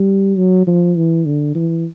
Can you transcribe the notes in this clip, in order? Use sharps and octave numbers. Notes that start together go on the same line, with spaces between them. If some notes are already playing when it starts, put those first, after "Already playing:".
Already playing: G3
F#3
F3
E3
D3
E3